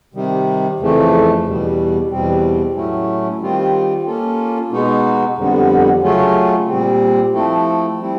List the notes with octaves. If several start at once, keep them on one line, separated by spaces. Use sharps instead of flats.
C3 D#3 G3
F2 C#3 E3 A3
E2 B2 G3
E2 B2 G3 C4
A2 F#3 A3 C#4 E4
D#3 G3 C4 F4
A#3 C#4 F4 A4
B2 G#3 B3 D#4 F#4
F2 D3 G3 B3
C#3 F#3 A3 C#4 F4
A#2 G3 C4
F3 A3 C4 E4 A4
G3 C4 E4